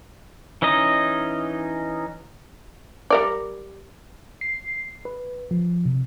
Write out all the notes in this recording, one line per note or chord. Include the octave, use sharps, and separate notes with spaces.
E3 C#4 D#4 D#5
G3 A#4 D5
C7
B4
F3
C3